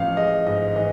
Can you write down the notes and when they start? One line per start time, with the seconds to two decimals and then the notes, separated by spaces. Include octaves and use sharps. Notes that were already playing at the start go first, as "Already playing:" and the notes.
Already playing: A1 F3 F5
0.17 G#3 D#5
0.47 G#2 D#5
0.76 E3 D#5